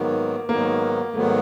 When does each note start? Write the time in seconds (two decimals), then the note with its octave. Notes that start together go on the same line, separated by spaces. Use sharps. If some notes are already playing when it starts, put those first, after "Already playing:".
Already playing: G#2 D#3 F#3 A#3 B3
0.49 G#2 D#3 F#3 A#3 B3
1.14 G#2 D#3 F#3 A3 B3